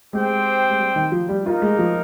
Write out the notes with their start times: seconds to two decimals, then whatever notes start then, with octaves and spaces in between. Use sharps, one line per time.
0.13 G#3 C4 G4 C5 G5
0.70 G#3
0.80 G3
0.96 D#3
1.12 F3
1.29 G3
1.45 A#3 D#4 F4 A#4
1.62 G#3
1.79 F3